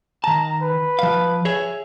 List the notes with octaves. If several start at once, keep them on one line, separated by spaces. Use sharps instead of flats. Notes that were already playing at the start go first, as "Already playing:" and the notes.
D#3 A5 A#5
B4
F3 F5
G#4 C#5 E5